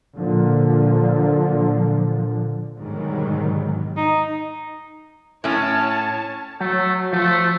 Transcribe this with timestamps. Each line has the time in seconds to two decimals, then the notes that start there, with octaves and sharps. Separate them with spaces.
0.17 A#2 D3 F3
2.81 G#2 B2 D3 D#3 F#3 G3
3.97 D#4
5.44 A2 C#4 C#5 A5
6.61 F#3 A3
7.12 F3 A3